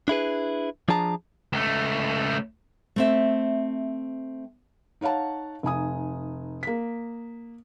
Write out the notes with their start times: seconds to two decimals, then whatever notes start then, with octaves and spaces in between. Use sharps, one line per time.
0.08 D4 E4 G#4 B4
0.88 F3 D4 G#4 A5 A#5
1.53 C#2 A3
2.96 A3 C4 E5
5.01 D#4 C#5 F5 F#5 A5
5.63 F1 D#4 G#5 D#6
6.63 A#3 B6